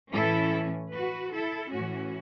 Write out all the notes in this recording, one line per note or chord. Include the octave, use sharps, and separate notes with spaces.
A2 E3 C#4 E4 A4
F#4 B4
E4 A4
A2 E3 C#4 F#4